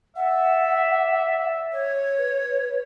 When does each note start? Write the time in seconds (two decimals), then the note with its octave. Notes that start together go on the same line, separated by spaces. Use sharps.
0.16 D5 E5 F#5
1.73 C#5
2.18 B4